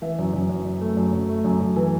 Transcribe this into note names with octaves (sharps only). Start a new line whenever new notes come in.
E3 E5
F#2
F#2
F#2
F#2
A3
F#2
F#2
A3
F#2
F#2
E3